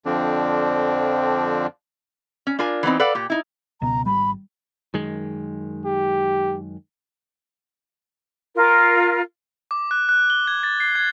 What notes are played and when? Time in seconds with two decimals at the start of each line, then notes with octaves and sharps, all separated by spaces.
0.06 F2 D3 F3 C4 D4
2.47 C#4
2.59 D4 F4 A#4 G#5
2.83 E3 B3 C4 D#4
3.00 A4 B4 D5 F5 F#5
3.15 A#2 G4
3.30 D#4 E4
3.82 C#2 B2 A#5
4.06 G#1 G3 B5
4.94 F#2 D#3 G#3
5.85 G4
8.56 F4 A#4
9.71 D6
9.91 F#6
10.09 F#6
10.30 G7
10.47 G#6
10.63 A6
10.80 C7
10.95 G#6